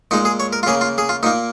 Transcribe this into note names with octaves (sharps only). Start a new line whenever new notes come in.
A#2 G#3 D#4
G#4
C#5
A#4
F4
C#3 A#3 G#4
F4
G#4
F4
A#2 A#3 D#4